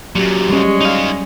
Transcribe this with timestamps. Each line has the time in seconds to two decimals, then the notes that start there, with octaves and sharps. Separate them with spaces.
0.15 F#2 A#2 F#3 G4
0.50 G3 G#3 C#4 C#5
0.81 D#4 F5